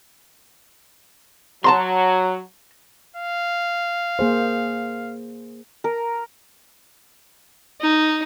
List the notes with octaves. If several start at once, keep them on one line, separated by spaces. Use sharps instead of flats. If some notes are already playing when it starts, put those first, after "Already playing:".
F#3 A5 A#5 C6
F5
A#3 G#4 C5
A#4
D#4